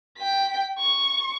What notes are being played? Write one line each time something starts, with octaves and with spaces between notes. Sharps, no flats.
G5 B6
C#6